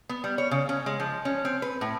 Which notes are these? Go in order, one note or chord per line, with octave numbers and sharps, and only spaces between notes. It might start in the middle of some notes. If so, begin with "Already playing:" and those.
B3
G3
C#5
C#3
C#4
G#3
F3
C#4
C4
B4
A2